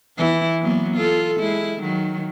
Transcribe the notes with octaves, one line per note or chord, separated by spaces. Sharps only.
E3 B3 E4
F#3 A#3 B3
F4 A4
G#3 E4
D#3 F#3